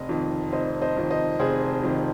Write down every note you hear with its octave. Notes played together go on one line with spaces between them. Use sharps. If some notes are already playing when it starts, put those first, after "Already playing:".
Already playing: F1 D#5
F2 D#3
F1 C5 D#5
C5 D#5
F2 D#3
C5 D#5
F1 G#4 C5
F2 D#3